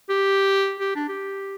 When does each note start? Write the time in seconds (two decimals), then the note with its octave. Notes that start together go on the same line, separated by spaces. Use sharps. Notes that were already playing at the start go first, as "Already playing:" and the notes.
0.09 G4
0.80 G4
0.95 D4
1.09 G4